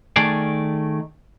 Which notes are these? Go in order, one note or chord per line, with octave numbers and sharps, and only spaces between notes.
D#3 A3 G#4 D5